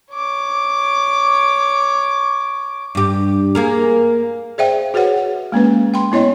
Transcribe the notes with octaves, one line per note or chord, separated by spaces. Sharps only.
C#5 D6
G2 G4
A#3 G#4 A#4
G#4 C5 D5 E5 F5 G5
F#4 G#4 B4 C#5 F#5
F#5
G#3 A#3 C#4 B4
G5 B5 C6
B3 E4 C#5 D#5 G5